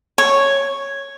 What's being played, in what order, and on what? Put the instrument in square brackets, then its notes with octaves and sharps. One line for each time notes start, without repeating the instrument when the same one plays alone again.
[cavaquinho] C#5